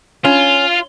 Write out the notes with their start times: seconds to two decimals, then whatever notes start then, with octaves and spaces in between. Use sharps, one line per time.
0.25 C#4 F4